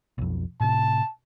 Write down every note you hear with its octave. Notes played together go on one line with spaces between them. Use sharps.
B1 F2
A2 C3 A5